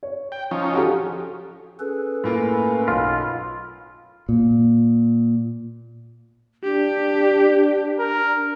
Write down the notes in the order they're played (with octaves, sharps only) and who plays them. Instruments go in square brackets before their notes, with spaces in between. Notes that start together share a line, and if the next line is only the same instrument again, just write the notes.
[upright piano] C#5
[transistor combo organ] G5
F3 C#4 D#4
[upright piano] F#4 G4 A4
[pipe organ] C#4 A4 B4 [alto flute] G#4
[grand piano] A2 A#3 F4 [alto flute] G#5
[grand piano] B1 [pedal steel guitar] F4 [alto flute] B5
[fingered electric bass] A#2
[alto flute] D4 [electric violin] G4
[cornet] A#4